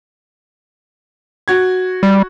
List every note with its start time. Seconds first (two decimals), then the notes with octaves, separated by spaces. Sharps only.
1.48 F#4 G#6
2.03 G3